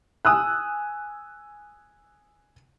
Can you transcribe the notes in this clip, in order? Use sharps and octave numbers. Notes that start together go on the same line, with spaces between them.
G#5 D#6 E6 F#6